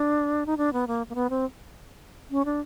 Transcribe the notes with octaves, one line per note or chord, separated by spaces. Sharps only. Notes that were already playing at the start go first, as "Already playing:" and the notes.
Already playing: D4
D#4
D4
B3
A#3
A#3
B3
C4
C#4
D4